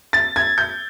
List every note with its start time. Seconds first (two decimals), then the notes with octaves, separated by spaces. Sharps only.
0.13 A6
0.36 G#6
0.58 G6